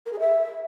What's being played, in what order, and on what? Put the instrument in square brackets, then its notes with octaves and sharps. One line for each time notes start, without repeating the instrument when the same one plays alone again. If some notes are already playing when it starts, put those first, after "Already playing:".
[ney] A#4
G#4
E5